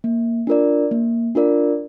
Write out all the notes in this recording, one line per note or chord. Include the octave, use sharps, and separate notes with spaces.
A#3
D4 F4 A#4 D5
A#3
D4 F4 A#4 D5